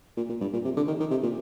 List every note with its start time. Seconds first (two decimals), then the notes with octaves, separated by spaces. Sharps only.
0.17 A#2
0.29 A#2
0.41 G2
0.53 A#2
0.65 C3
0.77 D3
0.88 D#3
1.00 D#3
1.11 C3
1.23 A#2